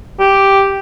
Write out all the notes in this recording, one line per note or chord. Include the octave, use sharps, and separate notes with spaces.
G4